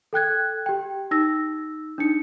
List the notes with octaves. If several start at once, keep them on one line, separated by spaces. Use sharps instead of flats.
A4 G5 F#6 G#6
G4 G5
D#4 E6 A#6
D4 D#4 C#7